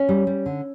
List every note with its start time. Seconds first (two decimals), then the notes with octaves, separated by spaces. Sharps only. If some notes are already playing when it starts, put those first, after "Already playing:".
Already playing: C#4
0.09 G3
0.27 G3
0.46 D3